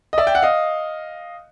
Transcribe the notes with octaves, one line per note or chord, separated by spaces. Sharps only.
D#5
D5 E5
G5
F#5
D#5 F5